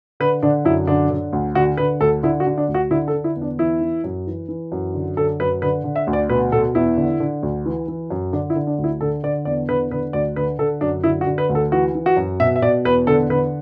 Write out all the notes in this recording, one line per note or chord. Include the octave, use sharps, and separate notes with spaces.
D3 B4
D3 D4
F#2 E4
D3 D4
D3
D2
D3 F#4
D3 B4
D2 A4
D3 E4
F#4
D3
D4
D2
F#4
D3 E4
A4
D3
E4
E2
D4
E3 E4
E3
F#2
E3
E3
F#2
D3
D3 A4
F#2 B4
D3 B4
D3
E5
D2
D5
B2 B4
B2 A4
E2 E4
D3
D3
D2
E3
E3
F#2
D3 D4
E4
D3
D4
D2
E4
D3 A4
D3 D5
E2 D5
D3 B4
D3 B4
D2 D5
D3 B4
D3 A4
F#2 D4
D3 E4
F#4
D3
B4
D2
A4
E3 F#4
E3
F#4
F#2
B2 E5
E5
B2 D5
E2 B4
D3 A4
D3 B4